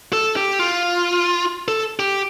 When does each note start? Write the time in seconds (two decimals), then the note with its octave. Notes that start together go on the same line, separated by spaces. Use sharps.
0.13 A4
0.36 G4
0.59 F4
1.68 A4
1.99 G4